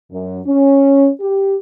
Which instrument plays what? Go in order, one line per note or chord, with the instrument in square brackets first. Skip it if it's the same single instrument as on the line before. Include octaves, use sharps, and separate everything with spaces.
[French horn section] F#2
C#4
G4